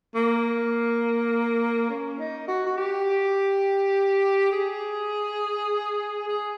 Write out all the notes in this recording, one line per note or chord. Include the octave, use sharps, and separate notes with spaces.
A#3
C#4
D#4
F#4
F#4
G4
G#4
G#4